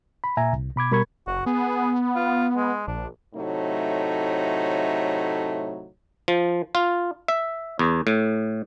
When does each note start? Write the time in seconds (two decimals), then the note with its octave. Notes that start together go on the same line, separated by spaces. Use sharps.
0.24 B5
0.37 A#2 E5 G#5 A#5
0.53 C2
0.76 B2 B5 D6 G#6
0.91 B2 G3 A#4 B5 C#6 G#6
1.27 F#1 F#4
1.46 B3 G#4
2.16 F4
2.56 G#3
2.87 A#1 D4
3.34 A2 C3 F#3 A3 D#4
6.28 F3
6.75 F4
7.28 E5
7.79 E2
8.07 A2